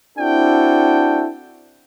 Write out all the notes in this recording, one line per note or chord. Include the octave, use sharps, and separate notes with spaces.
C4 D4 E4 F#4 A4 G5